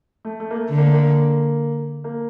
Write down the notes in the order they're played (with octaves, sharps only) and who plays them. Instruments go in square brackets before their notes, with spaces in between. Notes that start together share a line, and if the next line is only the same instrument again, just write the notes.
[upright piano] A3
A3
A#3
A3
[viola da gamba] D3
[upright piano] A#3
A3
A#3
A#3